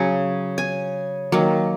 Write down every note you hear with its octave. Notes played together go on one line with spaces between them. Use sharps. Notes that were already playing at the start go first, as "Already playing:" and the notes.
Already playing: C#3 F#3 C#4 G#5
G#5
D#3 F#3 A#3